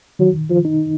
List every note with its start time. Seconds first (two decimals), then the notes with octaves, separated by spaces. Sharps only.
0.19 D#3 F#3
0.50 F3
0.65 D#4